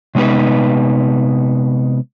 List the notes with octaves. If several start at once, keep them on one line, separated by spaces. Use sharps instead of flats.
C3 G#3 B3 D#4 B4